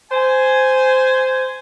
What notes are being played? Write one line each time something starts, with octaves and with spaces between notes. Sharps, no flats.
C5 G#5